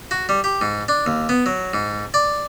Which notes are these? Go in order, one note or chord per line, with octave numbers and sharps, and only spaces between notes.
F#4
G3
G4
G#2
D4
D#2
B3
F#3
G#2
D5